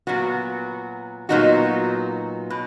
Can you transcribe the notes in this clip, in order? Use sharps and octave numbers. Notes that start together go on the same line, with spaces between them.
A#2 F#3 B3 F#4
A#2 F#3 B3 D#4 F#4
B2